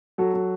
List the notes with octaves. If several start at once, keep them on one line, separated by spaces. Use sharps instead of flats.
F#3 F#4 A4
F#3